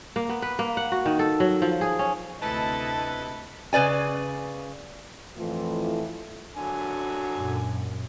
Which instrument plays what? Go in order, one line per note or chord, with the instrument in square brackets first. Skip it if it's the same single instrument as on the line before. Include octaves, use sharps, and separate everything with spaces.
[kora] A#3
B3
B4
A#3
F#5
F#4
D#3
A4
F#3
F3
G#4
C#4
[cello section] D2 C3 D#5 [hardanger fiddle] E4 A4 [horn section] B4 [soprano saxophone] A5
[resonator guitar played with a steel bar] C#3 B4 D5 G#5
[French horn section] F2 A2 E3 F3 A3 F4
[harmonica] D3 F#3 G#5
[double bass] F#2 A#2